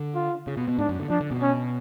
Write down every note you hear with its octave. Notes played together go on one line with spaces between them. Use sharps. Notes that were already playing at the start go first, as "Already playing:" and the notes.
Already playing: D3
F4
C#3
B2
B2
G#2 D4
F#2
D3
F3 D4
D3
B2
C#4